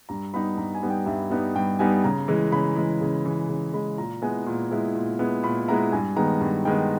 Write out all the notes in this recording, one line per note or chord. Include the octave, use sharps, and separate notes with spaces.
G2 A#5
G3 B3 D#4 B5
G2 A#5
G#5
G3 B3 D#4
G5
G2 E5
G3 B3 D#4
G2 G5
G3 B3 D#4 G#5
C#3 A#5
E3 G#3
C#3 B5
E3 G#3
C#3
E3 G#3
C#3
E3 G#3 B5
A#2 A#5
G#3 B3 E4 G#5
A#2
G#3 B3 E4
A#2
G#3 B3 E4
A#2 B5
G#3 B3 E4 A#5
G2 G#5
D#3 G#3 B3 A#5
G2
D#3 G#3 B3 G5